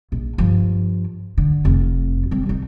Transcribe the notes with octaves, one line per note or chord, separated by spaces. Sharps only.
A#1
G2 F3
D3
F1 F2
G3 C4
C2 D#4